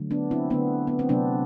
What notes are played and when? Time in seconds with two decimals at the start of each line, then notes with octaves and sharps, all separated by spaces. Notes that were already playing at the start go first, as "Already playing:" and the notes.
Already playing: D3 F#3 A3
0.11 B3 D4
0.31 C4 E4
0.50 D3 A3 B3 D4
0.87 B3
0.99 C4
1.09 C3 F#3 A3 B3 D4